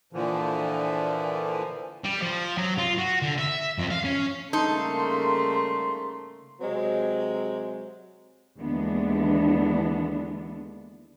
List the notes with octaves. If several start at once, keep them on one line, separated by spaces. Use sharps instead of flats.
A#2 D3 E3 F3
G3
F3
F#3
F4
F#4
D3
E5
F2
F5
C#4
G#2 C#3 G3 A3 A#3 D#4 A4 C6
C3 F#3 G#3 C4
D#2 D3 E3 G#3 B3 D4